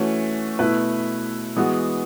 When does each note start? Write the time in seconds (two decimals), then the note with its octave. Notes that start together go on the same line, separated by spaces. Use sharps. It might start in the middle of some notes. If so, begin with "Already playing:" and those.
Already playing: E3 A3 C#4 F#4
0.59 B2 A3 E4 B4
1.56 E3 G#3 B3 F#4